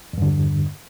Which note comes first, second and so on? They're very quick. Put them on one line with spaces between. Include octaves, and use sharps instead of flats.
E2 G2 D3